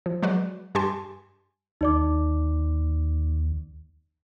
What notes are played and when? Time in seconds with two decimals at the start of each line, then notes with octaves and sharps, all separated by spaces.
0.06 F3
0.23 F#3 G#3 F#4 B4 D5
0.75 G2 G4 G#5 A5 C6
1.81 D#2 D#4 D5 D6